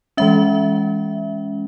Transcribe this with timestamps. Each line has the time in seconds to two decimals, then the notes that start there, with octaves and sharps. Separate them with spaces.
0.17 E3 G#3 C#4 E5